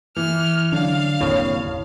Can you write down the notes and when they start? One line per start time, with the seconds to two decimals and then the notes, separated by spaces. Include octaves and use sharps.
0.16 E3 F6
0.72 D3 F#3 D4 F5
1.20 F#1 D#2 A2 C4